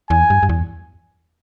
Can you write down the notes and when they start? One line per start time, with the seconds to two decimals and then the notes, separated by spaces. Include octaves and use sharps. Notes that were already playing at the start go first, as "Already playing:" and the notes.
0.10 E2 G#5
0.30 G2
0.43 G2
0.49 E2